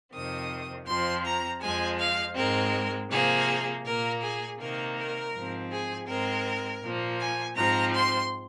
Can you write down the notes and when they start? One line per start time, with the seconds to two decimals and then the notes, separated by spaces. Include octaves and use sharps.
0.13 F2 C3 D#3 C4 D#6
0.88 F2 F3 C4 C6
1.24 A#5
1.62 F2 F3 G#3 G#5
1.99 F5
2.36 G#2 G#3 C4 A#4
3.11 C3 F3 A#3 G#4
3.85 A#2 A#3 A#4
4.22 G#4
4.59 C3 D#3 A#3 A#4
4.97 A#4
5.34 G#2 F3 C4
5.71 G#4
6.08 G#2 G#3 C4 A#4
6.83 A#2 F3 A#3
7.20 G#5
7.57 G#2 F3 C4 A#5
7.94 C6